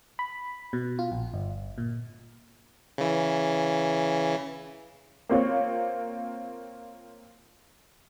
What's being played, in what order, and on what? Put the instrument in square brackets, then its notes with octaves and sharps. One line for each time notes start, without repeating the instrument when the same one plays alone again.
[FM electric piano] B5
B2
F4
A#1
G1
A#2
[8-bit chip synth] C#3 E3
[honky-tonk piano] A#3 C4 F4 C#5